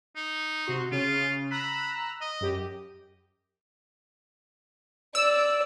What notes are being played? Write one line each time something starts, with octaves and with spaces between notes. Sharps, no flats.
D#4
C3 F#4 C6
C#3 F4
A#5 B5 E6 F#6
D#5
F#2 G4
D5 E6